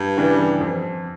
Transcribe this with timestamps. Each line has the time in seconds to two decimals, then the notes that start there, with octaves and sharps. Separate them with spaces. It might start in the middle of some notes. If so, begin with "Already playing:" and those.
Already playing: G2
0.17 C#3 E3 G3 D4
0.60 F2